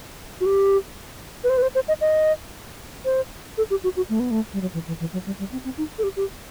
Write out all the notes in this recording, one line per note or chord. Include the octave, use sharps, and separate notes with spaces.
F#4
G4
B4
C5
B4
C5
C5
D#5
D#5
C5
A4
G4
F#4
F#4
A3
B3
A3
G3
F#3
E3
E3
E3
F#3
G3
G3
C4
C4
D#4
A4
G4
G4